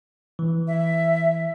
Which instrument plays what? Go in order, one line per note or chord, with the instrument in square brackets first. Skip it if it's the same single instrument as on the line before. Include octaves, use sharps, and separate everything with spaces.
[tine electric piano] E3
[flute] E5